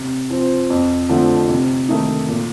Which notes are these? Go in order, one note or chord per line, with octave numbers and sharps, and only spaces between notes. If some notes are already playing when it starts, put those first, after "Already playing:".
Already playing: C3
F3 C4
F2
D3 F3 A3 C4
C3
D#3 A3 D#4
A#2